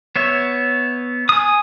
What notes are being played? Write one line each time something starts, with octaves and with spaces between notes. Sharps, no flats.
B3 C#5 E5
G#5 D#6